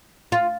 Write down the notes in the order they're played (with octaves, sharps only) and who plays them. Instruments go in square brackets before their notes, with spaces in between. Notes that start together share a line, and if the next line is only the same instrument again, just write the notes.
[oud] F4